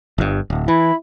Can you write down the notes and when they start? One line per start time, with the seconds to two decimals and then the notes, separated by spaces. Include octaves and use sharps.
0.18 G1 G2
0.50 D1
0.68 E3 E4